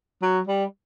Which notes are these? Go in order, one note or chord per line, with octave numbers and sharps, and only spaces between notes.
F#3
G3